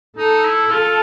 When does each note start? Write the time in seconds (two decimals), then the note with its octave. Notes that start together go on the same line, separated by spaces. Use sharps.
0.18 D#4 A4
0.45 E4
0.70 F4 A4